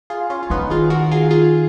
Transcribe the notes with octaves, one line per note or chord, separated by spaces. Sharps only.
F4 G#4
C#4 F4
F4
D#3 B3 D#4
F4 G#4
F#4 A#4
F4 G#4
F4 G#4